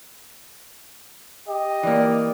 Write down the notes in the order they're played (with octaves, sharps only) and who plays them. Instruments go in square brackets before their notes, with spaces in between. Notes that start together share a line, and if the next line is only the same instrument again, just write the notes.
[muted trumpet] G4 [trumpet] D#5
[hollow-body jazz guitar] E3 A#3 [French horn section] D5